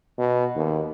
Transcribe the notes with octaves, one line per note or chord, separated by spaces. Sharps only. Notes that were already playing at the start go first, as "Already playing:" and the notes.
B2
D#2